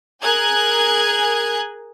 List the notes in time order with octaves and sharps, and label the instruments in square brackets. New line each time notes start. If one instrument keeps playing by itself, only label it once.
[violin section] G#4 A#4 G#5 F#6 G#6